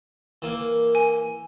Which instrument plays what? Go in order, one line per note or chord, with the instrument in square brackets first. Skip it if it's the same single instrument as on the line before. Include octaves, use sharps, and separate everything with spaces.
[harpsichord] E3 A#3
[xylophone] G#5